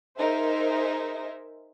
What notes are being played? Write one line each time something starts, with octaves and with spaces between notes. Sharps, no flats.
D#4 G#4 A#4 C5 E5